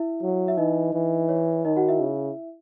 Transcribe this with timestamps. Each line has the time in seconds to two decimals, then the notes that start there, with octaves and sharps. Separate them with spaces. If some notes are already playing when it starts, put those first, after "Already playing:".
Already playing: E4 E5
0.22 F#3
0.48 E5
0.57 E3 D#4 D#5
0.93 E3
1.29 C#5
1.65 D#3 D#4 D#5
1.77 F#4 F#5
1.88 E4 E5
2.00 C#3